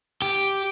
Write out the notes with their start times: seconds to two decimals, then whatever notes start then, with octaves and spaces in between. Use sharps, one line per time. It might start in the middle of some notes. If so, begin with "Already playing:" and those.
0.22 G4